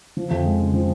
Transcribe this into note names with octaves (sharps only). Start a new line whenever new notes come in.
F3
F2
G#3
C#3
F3